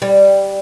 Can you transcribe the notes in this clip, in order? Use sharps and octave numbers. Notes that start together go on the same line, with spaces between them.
G3